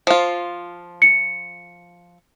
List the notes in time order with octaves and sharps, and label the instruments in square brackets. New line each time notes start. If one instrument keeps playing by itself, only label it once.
[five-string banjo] F3 F4
[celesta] C#7